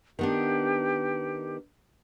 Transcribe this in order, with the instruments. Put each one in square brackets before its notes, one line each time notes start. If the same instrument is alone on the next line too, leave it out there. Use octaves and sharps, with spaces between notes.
[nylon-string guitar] D#3 B3 D4 [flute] G4